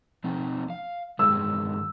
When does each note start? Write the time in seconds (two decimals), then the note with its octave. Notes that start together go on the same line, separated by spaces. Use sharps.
0.24 F3 C4 D#4
0.70 F5
1.19 G2 D#3 G#3 E6